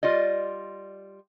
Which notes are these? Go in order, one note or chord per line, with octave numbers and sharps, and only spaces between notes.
G3 F4 D5 D#5